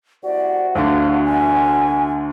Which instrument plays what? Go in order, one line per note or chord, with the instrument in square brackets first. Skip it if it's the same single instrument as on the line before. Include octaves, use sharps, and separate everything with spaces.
[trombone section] C2 F#4 [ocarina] D5
[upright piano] D2 D3 [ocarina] F5
[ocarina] G#5